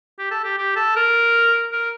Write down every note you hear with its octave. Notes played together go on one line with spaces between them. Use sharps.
G4
A4
G4
G4
A4
A#4
A#4